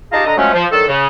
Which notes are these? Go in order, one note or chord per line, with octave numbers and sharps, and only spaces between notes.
D#4 F4 G4 G#4 A5 A#5
D3 D#5 A#5
F3 F#3 G#3 A3 C#4
F3
D3 D#3 F#3 A4
C#3